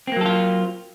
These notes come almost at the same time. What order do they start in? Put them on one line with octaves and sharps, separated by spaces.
C4 A#3 F#3 A4 F4